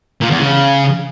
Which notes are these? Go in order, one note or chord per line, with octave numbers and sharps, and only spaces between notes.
A#2
E2
C#3